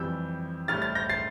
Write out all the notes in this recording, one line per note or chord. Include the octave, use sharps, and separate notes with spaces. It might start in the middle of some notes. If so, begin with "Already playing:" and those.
Already playing: F2 E3 G3 E6 G6
A2 G3 F6 A6
F6 A6
G6 A#6
A6 C7